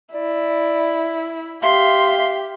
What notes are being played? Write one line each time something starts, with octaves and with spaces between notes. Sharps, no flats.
E4 D5
G4 E5 F5 C6